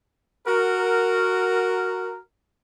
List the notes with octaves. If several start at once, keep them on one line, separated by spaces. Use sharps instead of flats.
F#4 A#4